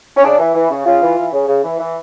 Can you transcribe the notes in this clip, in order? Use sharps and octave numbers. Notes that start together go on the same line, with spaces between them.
C#4
C#3 D4
E3
E3
C#3
C#3 F4
E3
E3
C#3
C#3
E3
E3